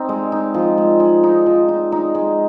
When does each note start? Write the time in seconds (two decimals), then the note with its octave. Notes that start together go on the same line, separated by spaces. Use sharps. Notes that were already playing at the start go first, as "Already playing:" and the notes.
Already playing: C4 D#4
0.09 G#3
0.32 D#4
0.54 F3
0.78 G#3
1.00 G#3
1.24 D#4
1.46 F3
1.69 D#4
1.92 D#4
2.15 G#3